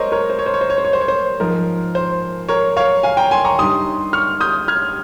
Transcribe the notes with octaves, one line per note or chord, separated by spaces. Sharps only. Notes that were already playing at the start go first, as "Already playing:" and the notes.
Already playing: G#3 A#4 C5 C#5 D#5
A#4 C#5
C5
C#5
C5
C#5
C5
C#5
C5
C#5
C5
C#5
C5
G#2 F3 G#3 A#4
C5
A#4 C#5
C#5 F5
F5 G#5
G5 A#5
G#5 C6
A#5 C#6
G2 D#3 G3 C6 D#6
C#6 F6
D#6 G6
F6 G#6